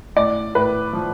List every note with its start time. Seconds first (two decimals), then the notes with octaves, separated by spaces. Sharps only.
0.16 A2 D5
0.55 A2 B4
0.93 F3